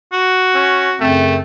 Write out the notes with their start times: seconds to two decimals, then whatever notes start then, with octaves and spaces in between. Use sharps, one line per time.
0.13 F#4
0.54 C#4
1.00 F#2 C#3 A3 C4